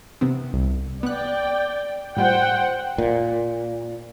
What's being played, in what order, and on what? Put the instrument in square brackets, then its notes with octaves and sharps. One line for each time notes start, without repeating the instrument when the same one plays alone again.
[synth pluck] C3 B3 C4
C2
[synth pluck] B3 F#6 [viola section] D5 G5
[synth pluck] A2 G3 F4 [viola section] C5 F#5 G5
[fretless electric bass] A#2